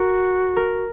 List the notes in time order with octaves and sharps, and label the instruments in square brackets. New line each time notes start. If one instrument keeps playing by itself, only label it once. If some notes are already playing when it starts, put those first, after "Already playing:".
Already playing: [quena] F#4 [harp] A#4
[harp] A#4